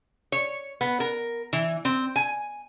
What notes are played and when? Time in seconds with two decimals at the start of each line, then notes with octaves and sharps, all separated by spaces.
0.32 C#5
0.81 B3
1.00 A#4
1.53 E3
1.85 C4
2.16 G#5